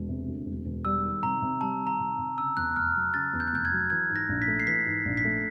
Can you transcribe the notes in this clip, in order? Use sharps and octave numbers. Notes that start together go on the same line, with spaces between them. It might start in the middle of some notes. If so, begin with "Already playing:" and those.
Already playing: E1
C3
D2
E1
E1
G3 E6
D#3
C3 A#5
C3
G3 A5
D#3
A#5
C3
C3
C#3 E6
E2 F#6
F1 F6
F#3
C#3 A6
E2
G6
F#6
F1 G6
G#6
F#3
E3 G#6
G#2
A#6
A#1
B6
A3
C7
E3 B6
G#2
A#1
B6
A3